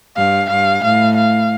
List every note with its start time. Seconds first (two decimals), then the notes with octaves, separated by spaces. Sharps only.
0.17 G2 F5
0.50 G2 F5
0.83 A2 F5
1.16 F5